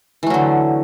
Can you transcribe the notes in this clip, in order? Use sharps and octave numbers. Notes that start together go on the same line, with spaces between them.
D3 E3 F#3 A3